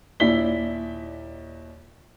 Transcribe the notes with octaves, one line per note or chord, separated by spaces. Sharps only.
D#2 A#2 E4 D5 B6 G7